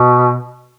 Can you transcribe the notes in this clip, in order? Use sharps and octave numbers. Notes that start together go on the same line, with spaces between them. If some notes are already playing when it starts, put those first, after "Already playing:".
Already playing: B2